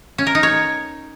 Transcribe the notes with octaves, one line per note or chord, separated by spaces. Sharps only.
C#4
A#4
D#4
C#5